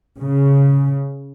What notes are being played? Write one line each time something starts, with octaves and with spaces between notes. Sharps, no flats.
C#3